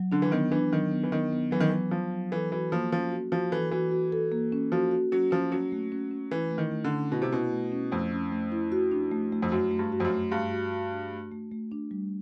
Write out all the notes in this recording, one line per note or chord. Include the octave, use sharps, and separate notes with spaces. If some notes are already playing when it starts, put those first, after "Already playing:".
Already playing: F#3
D3 D4
E3
D#3 B3
E3 D4
D#3 F#3
B3
E3
D#3 B3
B3
E3 F#3
D#3
E3 B3
F3 F#3
F#3
E3 A4
E3 F#4
F3 A#3
F3 C#4
F#4
F3 F#4
E3 A4
E3 F#4
F#4
A4
A#3
C#4
F3 F#4
F#4
F#3 C#4
F3 C#4
F#3 C#4
A3
C#4
C#4
E3 E4
A3
D#3
A3
D3
C#4
B2 E4
C3
B2 E4
A3
C#4
F2 A3
C#4
A3
E4
F#4
D4
A3
A3
F2
F#2 F#4
A3
G2
F#4
F2
F#2
A3
G2 A3
F#4
F#4
D4
A3
A3
A3
D4
G3